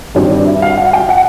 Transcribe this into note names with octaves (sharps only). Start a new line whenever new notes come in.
G2 D#3 G3 C4 C#5
D5
E5
F5
F#5
G5
F#5